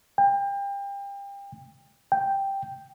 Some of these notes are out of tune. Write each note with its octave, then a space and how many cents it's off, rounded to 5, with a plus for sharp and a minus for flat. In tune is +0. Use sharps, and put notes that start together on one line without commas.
G5 +30
G5 +0